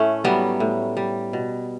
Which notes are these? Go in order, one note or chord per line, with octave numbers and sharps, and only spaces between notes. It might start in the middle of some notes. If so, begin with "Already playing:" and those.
Already playing: A2 A3 C#4
F#3 G3 B3
A2
G3
B2